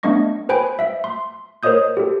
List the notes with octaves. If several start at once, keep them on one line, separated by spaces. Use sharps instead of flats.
A3 B3 D4 D#5 C#6 A#6
B4 C5 G5 G#5 B5 D7
E5 B6
C6
A#4 C5 C#5 D#5 D#6 G6
G4 A4